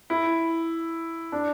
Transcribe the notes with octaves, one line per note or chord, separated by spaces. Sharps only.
E4
D4